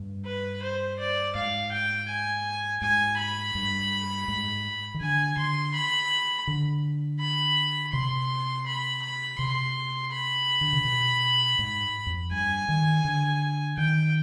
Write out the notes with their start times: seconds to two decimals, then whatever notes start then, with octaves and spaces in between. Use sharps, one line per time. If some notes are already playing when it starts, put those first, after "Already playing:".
Already playing: G2
0.25 B4
0.63 C5
0.99 D5
1.35 G#2 F5
1.72 G5
2.08 G#5
2.81 G#2 G#5
3.18 B5
3.55 G2
4.28 G#2
4.94 D#3
5.01 D3 G#5
5.37 D3 C6
5.74 B5
6.47 D3
7.20 B5
7.93 C3 C6
8.66 B5
9.02 B5
9.39 C3 C6
10.12 B5
10.61 D3
10.73 C3
10.85 B2
11.59 G#2
12.06 F2
12.31 G2 G#5
12.69 D#3
13.05 D3
13.78 D#3 G5